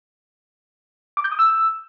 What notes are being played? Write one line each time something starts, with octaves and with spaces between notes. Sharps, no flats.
D6
G6
D#6
E6